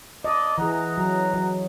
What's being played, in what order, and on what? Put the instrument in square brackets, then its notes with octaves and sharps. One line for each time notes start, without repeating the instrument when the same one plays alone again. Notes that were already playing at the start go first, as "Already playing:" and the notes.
[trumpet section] A#3 D4 D5 [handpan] D#5
[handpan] E3 G#4 [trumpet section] F#5 A#5
[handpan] F#3
F#3